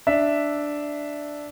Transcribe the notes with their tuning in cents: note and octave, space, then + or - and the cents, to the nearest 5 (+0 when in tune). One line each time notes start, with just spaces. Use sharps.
D4 +0 E5 +0